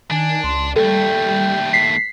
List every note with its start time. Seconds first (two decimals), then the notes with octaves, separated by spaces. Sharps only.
0.11 D#3 D4 G#5
0.44 C#2 C6
0.76 D#2 G3 A3 A4 G5
1.73 B6 C7